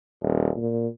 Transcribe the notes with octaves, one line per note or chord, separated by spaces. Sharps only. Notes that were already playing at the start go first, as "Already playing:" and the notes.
D#1
A#2